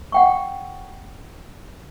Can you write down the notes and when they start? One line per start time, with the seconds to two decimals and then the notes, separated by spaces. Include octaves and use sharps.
0.12 F#5 G5 C#6